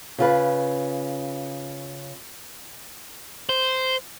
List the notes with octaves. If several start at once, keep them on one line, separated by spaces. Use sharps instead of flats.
C#3 F4 B4
C5